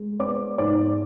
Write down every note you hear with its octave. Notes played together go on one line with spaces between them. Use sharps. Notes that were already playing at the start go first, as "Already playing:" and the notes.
Already playing: G#3
B3 D5 D6
G#2 D5 D6